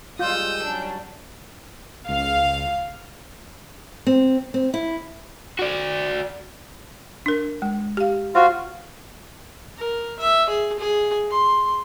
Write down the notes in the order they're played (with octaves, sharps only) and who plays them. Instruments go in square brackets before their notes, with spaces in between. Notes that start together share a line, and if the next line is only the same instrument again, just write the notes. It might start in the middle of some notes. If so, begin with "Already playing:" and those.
[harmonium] G3 G#3 [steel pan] F4 [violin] D#6 E6 [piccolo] G6
[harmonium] F#3 G3 C#4 [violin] D4
[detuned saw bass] C#2 [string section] F5
[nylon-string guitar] C4
C4
E4
[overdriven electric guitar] F#4 D5
[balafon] D4 A#4
G#3
G4 F5
[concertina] F4 F#4 [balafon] C5
[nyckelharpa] A#4
E5
G#4
G#4
C6